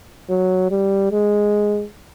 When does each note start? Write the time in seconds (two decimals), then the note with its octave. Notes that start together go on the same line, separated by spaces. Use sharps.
0.30 F#3
0.71 G3
1.11 G#3